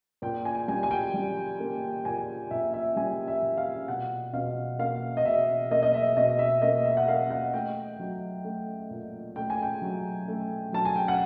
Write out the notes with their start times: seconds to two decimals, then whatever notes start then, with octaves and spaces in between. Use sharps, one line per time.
0.22 A#2 G5
0.45 G#5
0.68 G3 G#5
0.83 G#5
0.91 G5
1.14 G3
1.60 A#3
2.05 A#2 G#5
2.51 A#2 E5
2.74 E5
2.96 G3 G#5
3.28 E5
3.42 A#2
3.57 F5
3.88 B2 F#5
4.33 B2 F5
4.79 A#3 F5
5.17 D#5
5.25 B2 E5
5.71 A#3 D#5
5.83 D#5
5.94 E5
6.17 B2 D#5
6.39 E5
6.62 A#3 D#5
6.84 E5
6.97 F#5
7.08 A#3 F5
7.30 F#5
7.54 A3 G5
8.00 F#3
8.44 A3
8.90 A#2
9.36 A3 G5
9.50 G#5
9.62 G5
9.82 F#3
10.28 A3
10.73 F#3 A5
10.85 G#5
10.96 G5
11.08 F#5